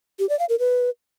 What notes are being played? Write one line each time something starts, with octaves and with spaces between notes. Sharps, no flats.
G4
D5
F5
A#4
B4